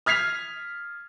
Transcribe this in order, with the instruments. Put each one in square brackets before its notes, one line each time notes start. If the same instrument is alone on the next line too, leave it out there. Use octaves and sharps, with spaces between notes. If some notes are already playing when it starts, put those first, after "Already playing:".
[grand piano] D#6 F6 G#6 B6 C7 F7